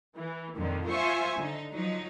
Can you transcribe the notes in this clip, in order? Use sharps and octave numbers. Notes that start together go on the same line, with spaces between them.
E3
F2 A#2 D3 D#3 F3
F4 C5 E5 G#5 C#6
D3 D#4
F3 F#3 D#4